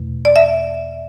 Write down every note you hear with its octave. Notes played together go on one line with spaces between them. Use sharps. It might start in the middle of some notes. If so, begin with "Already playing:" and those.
Already playing: E2 B2 A3
D5
E5